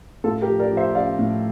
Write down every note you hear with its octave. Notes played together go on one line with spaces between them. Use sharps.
A2 F4 A4
G4 A#4
F3
A#4 D5
F3
C5 E5
F3 D5 F5
A2